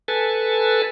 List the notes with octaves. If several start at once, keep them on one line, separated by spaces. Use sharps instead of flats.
A4 B4 G#5 A5